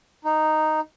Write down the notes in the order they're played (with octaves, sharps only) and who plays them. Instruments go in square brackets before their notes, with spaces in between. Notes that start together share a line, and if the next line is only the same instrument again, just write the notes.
[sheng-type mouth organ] D#4